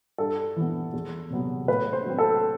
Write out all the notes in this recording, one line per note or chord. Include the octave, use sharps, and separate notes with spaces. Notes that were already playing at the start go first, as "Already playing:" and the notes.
G2 A4
E3 B3
E2
C3 F#3 B3
A2 B4
C5
F#3 C4
A4